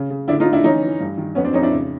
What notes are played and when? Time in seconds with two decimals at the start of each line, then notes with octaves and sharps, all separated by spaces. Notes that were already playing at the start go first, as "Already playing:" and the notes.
Already playing: C#3
0.10 C#3
0.28 D3 D4 E4
0.40 D#4 F4
0.46 D3
0.53 D4 E4
0.64 E3 C#4 D#4
0.83 E3
1.00 G2
1.18 D#3
1.35 F2 B3 C#4
1.44 C4 D4
1.53 F2 C#4 D#4
1.62 D4 E4
1.72 C#3